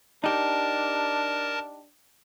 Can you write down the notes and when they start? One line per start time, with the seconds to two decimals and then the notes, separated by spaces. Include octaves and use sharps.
0.24 D4 D#4 G4 A#4 A5